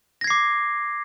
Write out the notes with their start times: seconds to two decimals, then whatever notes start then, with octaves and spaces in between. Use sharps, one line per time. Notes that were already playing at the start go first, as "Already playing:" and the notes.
0.21 A#6
0.24 G#6
0.27 C7
0.30 D6